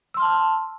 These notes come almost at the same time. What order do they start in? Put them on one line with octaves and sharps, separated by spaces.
E6 C6 F6 A5